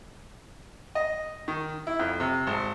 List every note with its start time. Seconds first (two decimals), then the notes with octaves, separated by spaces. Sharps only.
0.95 D#5
1.48 D#3
1.87 E4
2.00 F2
2.20 C3
2.47 G#1